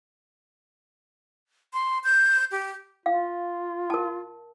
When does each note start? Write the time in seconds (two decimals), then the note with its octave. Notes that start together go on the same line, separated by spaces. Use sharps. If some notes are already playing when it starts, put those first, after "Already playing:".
1.73 C6
2.04 G6
2.51 G4
3.06 F4 F5
3.90 A#4 A5